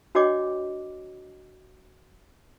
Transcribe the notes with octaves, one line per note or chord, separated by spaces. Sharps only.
D4 F#4 C#5 D#5 G5 D6